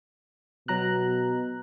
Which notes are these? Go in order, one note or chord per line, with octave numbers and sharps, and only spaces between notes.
B2 F#3 A#5 F#6